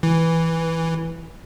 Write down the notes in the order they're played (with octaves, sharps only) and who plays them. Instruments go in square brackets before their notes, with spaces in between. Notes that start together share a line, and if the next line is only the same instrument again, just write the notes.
[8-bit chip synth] E3